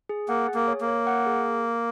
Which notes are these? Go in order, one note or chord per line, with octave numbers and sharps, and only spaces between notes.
G#4
A#3 F#5
G#4
A#3
C#5
A#3
C#5
F#5
G#4